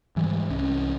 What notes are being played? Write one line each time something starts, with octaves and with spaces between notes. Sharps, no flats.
G#2 E3 G3
C2 C#4